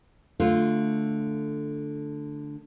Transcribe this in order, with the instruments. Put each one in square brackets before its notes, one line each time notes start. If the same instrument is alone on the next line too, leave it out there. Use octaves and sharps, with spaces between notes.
[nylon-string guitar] D3 A3 F4